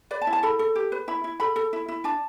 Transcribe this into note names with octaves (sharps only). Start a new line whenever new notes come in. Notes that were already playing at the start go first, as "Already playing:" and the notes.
B4 D5
A5
E4
A5
A4 B5
A4
G4
B4
E4 B5
E4
A4 B5
A4
E4
E4
D4 A5